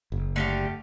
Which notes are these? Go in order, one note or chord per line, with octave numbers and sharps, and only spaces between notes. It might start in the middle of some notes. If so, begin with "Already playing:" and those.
F#1
D3 A3 G4 F5